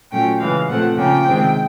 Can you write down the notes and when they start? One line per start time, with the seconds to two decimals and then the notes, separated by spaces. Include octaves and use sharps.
0.12 A#2 F#3 A3 C#4 G5
0.39 C#3 E3 G#3 F5
0.69 A#2 F3 A3 C4 F#5
0.97 C#3 F3 A#3 C#4 G5
1.25 C3 D#3 G#3 C4